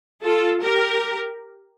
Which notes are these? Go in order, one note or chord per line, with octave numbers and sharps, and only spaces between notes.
F4 A4
G4 A#4